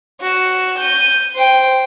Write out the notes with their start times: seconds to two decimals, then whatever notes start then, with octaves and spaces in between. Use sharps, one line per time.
0.20 F#4 E7
0.78 G6 D#7
1.35 C5 G5